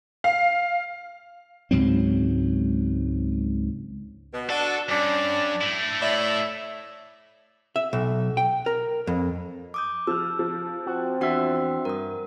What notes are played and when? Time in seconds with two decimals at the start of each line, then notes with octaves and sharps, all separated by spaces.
0.24 F5
1.71 C#2 G#2 F#3 C4
4.34 B2
4.50 D4 F#4 A4
4.89 G2 C#4 D4
5.61 A3 E4
6.01 A2 D5 E5
7.76 E5
7.93 B1
8.37 G5
8.66 A#4
9.07 F2
9.74 D6 D#6 G6
10.07 F3 E6 F6
10.39 F3
10.87 C4 F#4
11.21 E2 D4 F#4 E5 F#5
11.85 G2 A#4 D#6